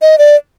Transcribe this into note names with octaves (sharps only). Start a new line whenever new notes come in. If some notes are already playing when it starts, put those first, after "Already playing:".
D#5
D5